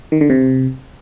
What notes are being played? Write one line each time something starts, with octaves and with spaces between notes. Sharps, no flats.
D#3
D3
C3